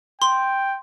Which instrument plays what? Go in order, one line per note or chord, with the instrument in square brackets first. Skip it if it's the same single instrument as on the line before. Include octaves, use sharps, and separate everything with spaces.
[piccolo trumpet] G5 [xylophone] C6